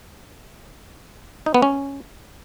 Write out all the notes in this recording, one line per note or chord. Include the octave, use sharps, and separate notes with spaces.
D#4
B3
C#4